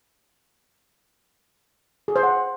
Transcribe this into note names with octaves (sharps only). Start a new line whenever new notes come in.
G#4
C5
F#5